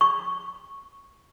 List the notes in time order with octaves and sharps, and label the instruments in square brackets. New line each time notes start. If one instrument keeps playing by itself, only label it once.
[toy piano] C#6